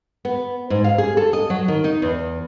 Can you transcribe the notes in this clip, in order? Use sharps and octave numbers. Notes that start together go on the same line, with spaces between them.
B3
G#2
F5
G#4
A4
D#5
F#3
D#3
D#4
E2